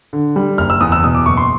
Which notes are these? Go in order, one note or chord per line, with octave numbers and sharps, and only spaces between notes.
D3
G3
F#1 F6
E6
E2 D#6
E6
B2 D#6
D6
F#1 C#6
C6